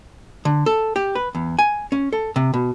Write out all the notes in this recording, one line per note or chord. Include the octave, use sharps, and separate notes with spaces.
D3
A4
G4
B4
E2
G#5
C#4
A4
C3
B2